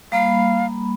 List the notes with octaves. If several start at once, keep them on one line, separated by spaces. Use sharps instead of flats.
G3 A#3 F5 B5